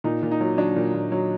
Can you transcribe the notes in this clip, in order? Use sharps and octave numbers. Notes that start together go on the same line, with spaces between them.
A#2 D#4
A#2
D#4
F#3
F#3 D4
A#2
A#2
F#3